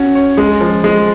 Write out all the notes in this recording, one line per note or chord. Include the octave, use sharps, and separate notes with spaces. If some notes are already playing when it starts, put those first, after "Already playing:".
Already playing: C#4 F#4 C#5
C#5
G#3
F3
G#3